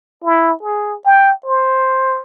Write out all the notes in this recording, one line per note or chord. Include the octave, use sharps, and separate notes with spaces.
E4
G#4
G5
C5